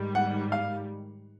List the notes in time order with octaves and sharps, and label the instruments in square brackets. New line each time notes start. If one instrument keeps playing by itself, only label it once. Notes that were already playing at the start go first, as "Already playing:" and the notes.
Already playing: [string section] G#2 D#3 G3
[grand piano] F#5
F5